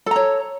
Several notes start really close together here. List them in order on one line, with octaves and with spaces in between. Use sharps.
A4 A#5 C#5